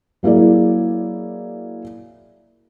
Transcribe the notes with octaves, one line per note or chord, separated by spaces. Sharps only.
F#3 A#3 E4 G#4 D5